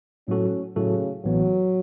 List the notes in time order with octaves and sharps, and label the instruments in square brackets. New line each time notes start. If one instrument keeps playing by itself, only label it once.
[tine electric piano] A2 F#3 A3 F#4 A4 [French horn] C#4
[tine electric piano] A2 F#3 A3 F#4 A4 [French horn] C#3
[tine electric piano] A1 A2 E3 B3 [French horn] F#3